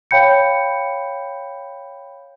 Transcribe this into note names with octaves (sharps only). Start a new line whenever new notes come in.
C#5 F5 G5 B5 G6 C#7